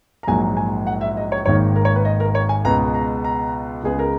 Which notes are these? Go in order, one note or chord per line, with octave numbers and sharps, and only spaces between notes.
A#5
A#1 G#2 F#3 A#3 G#5
G#5
F#5
E5
D#5
C#5
G#1 G#2 D#3 A#3 C#5
A#4
C#5
B4
D#5
A#4
C#5
G#5
C#2 B2 G#3 B3 A#5
A#5
A#5
C#2 C#3 G#3 B3 G#4
A#4